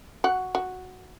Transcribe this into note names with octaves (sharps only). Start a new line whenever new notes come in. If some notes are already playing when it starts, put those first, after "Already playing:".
F#4 F#5
F#4